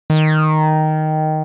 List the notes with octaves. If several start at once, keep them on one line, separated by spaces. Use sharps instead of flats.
D#3